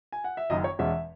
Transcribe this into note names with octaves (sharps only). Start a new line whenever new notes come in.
G#5
F#5
E5
F#1 F#2 D#3 D#5
C#5
E1 E2 B2 G#3 C#4 E5